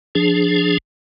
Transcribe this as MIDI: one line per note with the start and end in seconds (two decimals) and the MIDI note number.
0.15 0.78 53
0.15 0.78 62
0.15 0.78 68